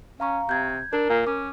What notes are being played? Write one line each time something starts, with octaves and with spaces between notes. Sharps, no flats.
C#4 F5 A#5 C#6
C3 G6 G#6
D4 A#4
A#2
C#4 D6